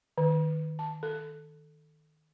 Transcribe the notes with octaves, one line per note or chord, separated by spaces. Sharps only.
D#3
A5
A4